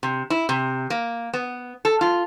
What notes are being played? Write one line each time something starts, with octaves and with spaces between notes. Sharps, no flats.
C3
E4
C3
A#3
B3
A4
F4